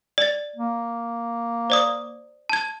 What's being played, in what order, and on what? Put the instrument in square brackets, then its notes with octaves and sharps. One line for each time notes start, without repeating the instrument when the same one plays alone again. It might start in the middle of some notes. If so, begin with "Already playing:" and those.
[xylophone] D5 A6
[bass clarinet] A#3
[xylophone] C5 D5 D#6
A5 G#6